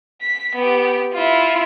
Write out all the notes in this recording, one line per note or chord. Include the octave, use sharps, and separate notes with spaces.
B6
B3 G4
E4 F4